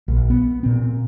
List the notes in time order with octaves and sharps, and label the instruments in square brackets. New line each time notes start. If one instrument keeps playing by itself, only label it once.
[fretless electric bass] A#1
B3
A#2 C4